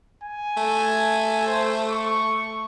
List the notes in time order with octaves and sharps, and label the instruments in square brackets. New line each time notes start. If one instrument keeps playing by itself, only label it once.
[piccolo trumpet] G#5
[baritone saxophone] A3
[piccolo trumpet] C5
C#6